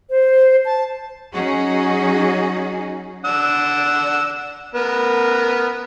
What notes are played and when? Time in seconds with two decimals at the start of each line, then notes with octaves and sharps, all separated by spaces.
0.10 C5
0.65 A5
1.33 F#3 C#4 D#4 F#4 G#4
3.25 D4 F#5 E6
4.75 B3 A#4